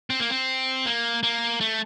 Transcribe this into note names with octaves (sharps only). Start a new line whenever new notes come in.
C4
A#3
C4
A#3
A#3
A3